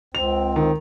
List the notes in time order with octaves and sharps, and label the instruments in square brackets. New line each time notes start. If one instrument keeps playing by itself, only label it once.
[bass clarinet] C#2 [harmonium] C4 [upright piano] F7
[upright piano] D#3